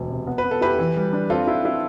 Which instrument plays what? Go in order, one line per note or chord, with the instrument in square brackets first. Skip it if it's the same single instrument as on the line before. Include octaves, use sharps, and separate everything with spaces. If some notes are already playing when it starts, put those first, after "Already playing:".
Already playing: [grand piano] E1 D2
C3
B3
[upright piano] B4
[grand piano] B3
[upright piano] A4
[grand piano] E4 [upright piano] G4 B4
[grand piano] E3
G3
D4
[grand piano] C4 [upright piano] F4 A4
[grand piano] E4
E4